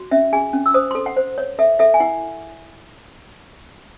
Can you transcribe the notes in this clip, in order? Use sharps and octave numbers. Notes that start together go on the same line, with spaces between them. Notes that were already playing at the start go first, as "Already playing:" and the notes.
Already playing: F#4
C#4 E5
G#4 G#5
C#4
E6
C5 D#6
A4 C6
F#5
C5
C#5
A4 E5
A4 E5
G#5
E4 F#5